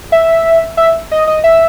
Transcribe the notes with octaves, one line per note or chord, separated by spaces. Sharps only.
E5
E5
D#5
D#5
E5